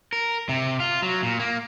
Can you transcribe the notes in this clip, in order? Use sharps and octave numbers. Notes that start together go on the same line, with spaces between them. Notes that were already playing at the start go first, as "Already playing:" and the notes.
A#4
C3
F4
F#3
A#2
A#3